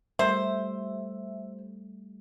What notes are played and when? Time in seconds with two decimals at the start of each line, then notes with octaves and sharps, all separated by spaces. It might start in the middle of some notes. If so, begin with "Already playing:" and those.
0.19 G3 A3 C5 E5